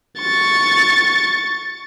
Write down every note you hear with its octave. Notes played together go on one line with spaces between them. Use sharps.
C#6 A6